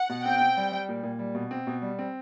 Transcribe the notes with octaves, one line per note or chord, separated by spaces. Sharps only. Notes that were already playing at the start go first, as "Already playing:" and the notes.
Already playing: F#5
B2
C4 G5
C4
G3
G3
A#2
A#2
G3
B2
C4
B2
G3
C4